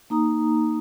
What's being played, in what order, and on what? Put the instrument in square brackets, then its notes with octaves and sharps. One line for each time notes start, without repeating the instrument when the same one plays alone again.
[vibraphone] A#3 D#4 A#5 D#6